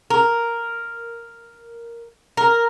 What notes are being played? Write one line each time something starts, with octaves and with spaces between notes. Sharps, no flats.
A#4
A#4